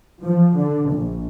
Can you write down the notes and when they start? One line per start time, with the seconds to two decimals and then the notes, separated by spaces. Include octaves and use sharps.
0.22 F3
0.56 D3
0.90 A#1